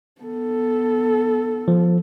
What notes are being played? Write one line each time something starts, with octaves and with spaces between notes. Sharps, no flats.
B3 A4
F3